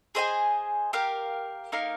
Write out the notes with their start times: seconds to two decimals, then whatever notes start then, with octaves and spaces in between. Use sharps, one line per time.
0.15 G#4 C5 D#5 G#5
0.93 G4 A#4 F5
1.72 A#3 D#4 A#4 F5